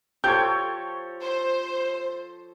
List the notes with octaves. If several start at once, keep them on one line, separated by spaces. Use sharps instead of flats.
F3 G4 A4 C#5 G6 G#6
C5